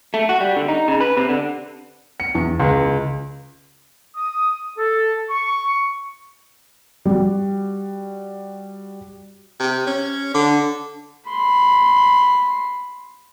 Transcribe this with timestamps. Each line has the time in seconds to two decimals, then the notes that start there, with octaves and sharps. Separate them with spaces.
0.14 A3
0.29 F#4
0.40 G3
0.56 D3
0.68 D#4
0.88 C#3
1.00 B4
1.17 C3
1.29 D3
2.20 C#7
2.35 E2
2.60 C#2
4.16 D#6
4.78 A4
5.31 C#6
7.05 G3 F#4
9.60 C3
9.87 C#4
10.34 D3
11.28 B5 C6